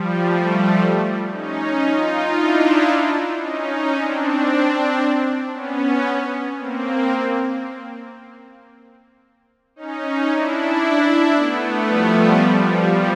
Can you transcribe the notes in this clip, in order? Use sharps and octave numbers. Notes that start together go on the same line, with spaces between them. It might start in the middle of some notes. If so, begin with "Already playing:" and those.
Already playing: F3 G3
G3 A3
C#4 D#4
D#4 F4
D4 E4
C#4 D#4
C4 D4
B3 C#4
A#3 C4
C#4 D#4
D4 E4
A3 B3
F3 G3
F3 G3